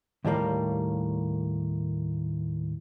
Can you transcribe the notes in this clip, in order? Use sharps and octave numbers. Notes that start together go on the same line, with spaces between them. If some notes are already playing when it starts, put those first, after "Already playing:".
D#2 A2 G3 A#3